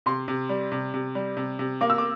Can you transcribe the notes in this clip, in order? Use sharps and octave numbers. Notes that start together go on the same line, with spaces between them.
C3 C6
C3
G3
C3
C3
G3
C3
C3
A#3 D6
E6
D6